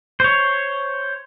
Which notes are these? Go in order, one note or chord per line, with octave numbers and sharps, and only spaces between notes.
C5 C#5